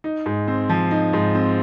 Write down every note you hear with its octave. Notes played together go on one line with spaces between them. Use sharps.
D#4
G#2
C4
F3
D#4
G#2
C4